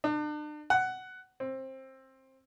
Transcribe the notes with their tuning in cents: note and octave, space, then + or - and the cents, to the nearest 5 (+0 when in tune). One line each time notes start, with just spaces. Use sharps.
D4 +40
F#5 +10
C4 +20